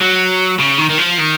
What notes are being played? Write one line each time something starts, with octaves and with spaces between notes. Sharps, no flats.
F#3
C#3
D#3
D#3
F3
D#3